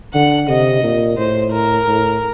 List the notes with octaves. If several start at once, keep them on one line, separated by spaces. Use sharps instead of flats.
D3 F#5
C3 D#5
A#2
A2 C5
A#4
A2